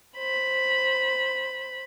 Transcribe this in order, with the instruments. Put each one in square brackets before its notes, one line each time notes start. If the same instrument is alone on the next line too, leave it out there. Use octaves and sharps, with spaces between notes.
[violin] C5 B5